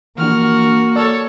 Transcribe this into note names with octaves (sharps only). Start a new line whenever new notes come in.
E3 F3 A#3 D4 F#4 F6
A4 C#5 D5